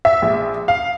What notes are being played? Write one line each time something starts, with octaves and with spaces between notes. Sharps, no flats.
E5
A#1
F5